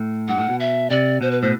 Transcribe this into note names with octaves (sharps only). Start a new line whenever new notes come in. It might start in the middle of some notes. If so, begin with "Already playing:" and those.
Already playing: A2
G2 F#5
A2
B2
E5
C3 D5
B2 C5
B4
A2 C5